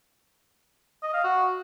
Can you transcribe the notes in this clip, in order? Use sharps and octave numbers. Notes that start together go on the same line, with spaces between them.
D#5
F5
F#4